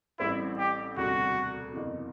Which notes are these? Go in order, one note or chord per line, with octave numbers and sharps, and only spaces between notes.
A1 A2 G3 C4 E4
G4
E1 D2 C3 G3 F#4
F#1 E2 C3